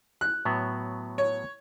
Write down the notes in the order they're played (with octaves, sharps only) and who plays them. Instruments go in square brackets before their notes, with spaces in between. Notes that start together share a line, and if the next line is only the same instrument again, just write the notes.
[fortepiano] F#6
[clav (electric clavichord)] A2 F#3 B3
[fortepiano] C#5